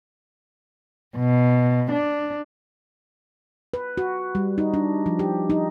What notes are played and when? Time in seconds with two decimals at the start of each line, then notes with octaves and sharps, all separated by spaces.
1.16 B2
1.90 D4
3.74 B4
3.97 F#4
4.35 G3
4.58 D#4
4.74 D4
5.06 F3
5.19 G4
5.50 D#4